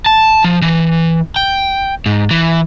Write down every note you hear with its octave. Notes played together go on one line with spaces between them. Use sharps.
A5
F3
E3
G5
G#2
E3